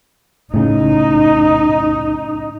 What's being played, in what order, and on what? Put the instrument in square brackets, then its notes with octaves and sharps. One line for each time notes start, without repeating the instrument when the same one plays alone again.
[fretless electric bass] A2 C#3 [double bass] D#4